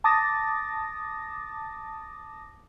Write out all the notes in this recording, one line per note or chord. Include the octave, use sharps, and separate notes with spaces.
A5 D6 D#6 A6 A#6